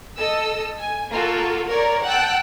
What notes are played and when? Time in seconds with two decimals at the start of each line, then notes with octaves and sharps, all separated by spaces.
0.17 A4 D#5 E6
0.79 G#5
1.10 A#3 F4 F#4 A4
1.67 A#4 C#5 D5 A#5
2.03 F#5 G5 A5 E6 F#6